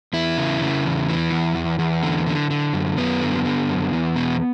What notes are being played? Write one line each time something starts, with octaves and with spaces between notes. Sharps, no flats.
E2 E4
C#3
C#3
E2
E3
E2
E2
E2
D3
D3
D3
F#2
F#2 B3
D3
D3
F#2
E2
B2